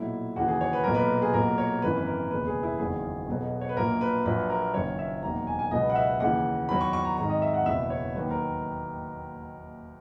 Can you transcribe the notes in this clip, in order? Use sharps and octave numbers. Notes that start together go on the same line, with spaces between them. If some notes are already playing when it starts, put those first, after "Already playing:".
Already playing: B1 A#2 F#3 E4
D#2 C#3 E3 F#4
G#4
C#5
B4
B1 A#2 F#3 A#4
B4
G#4
B1 A#2 F#3 A#4
C#5
G#1 F#2 E3 B4
B4
A#4
E1 D#2 C#3 B4
G#4
E4
F#1 E2 D#3 F#3 G#4
B1 B2 F#3
C#5
B4
A#1 A#2 F#3 A#4
B4
A#1 A#2 F#3 B4
A#4
F#1 F#2 D#3 F#3 C#5
E5
E1 D#2 D#3 F#3 A#5
G#5
G#5
C#2 B2 F#3 D#5
F#5
E5
D#2 C#3 E3 F#5
E2 D#3 F#3 B5
C#6
C#6
A#5
G#1 G#2 D#3 A#5
D#5
E5
F#5
F#1 E2 B2 E5
C#5
D#2 D#3 F#3 B4
A#4